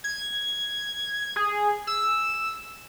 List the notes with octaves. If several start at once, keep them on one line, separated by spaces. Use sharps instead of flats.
G#6
G#4
E6